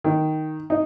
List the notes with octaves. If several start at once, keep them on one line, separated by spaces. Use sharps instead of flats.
D#3
D#4